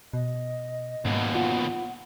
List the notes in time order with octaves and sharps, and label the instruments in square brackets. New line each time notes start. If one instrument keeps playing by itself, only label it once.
[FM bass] B2 [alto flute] D#5
[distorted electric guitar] D#2 B2 [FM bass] G#2
[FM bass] F4 [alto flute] F#5